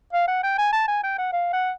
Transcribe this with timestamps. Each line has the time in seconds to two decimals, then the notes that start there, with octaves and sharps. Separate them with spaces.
0.13 F5
0.28 F#5
0.43 G5
0.58 G#5
0.73 A5
0.88 G#5
1.03 G5
1.18 F#5
1.33 F5
1.53 F#5